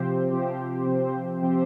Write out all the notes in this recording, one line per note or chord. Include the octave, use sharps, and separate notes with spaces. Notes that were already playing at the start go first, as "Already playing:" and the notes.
Already playing: C3 F3 C4 G4 C5
C3 F3 C4 G4 C5
C3 F3 C4 G4 C5
C3 F3 C4 G4 C5